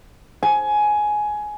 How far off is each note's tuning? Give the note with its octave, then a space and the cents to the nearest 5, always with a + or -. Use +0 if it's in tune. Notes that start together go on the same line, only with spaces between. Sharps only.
G#5 +15